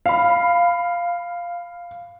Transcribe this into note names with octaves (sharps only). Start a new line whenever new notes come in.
F5 B5